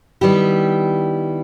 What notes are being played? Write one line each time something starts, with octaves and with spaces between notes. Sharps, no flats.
D#3 G3 B3 E4 G4